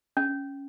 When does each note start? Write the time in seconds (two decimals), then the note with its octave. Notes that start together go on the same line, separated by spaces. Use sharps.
0.17 C#4